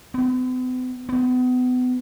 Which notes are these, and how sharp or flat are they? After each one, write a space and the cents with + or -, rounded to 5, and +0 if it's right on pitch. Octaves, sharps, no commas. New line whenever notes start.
B3 +45
B3 +30